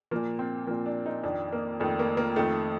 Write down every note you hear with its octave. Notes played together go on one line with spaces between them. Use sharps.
A#2 F3 A#3
C4
A#2 F3 A#3
D4
D#4
F2 D#3 D4
A#3
F2 D#3 A3
A#3
A#3
F2 D#3 A3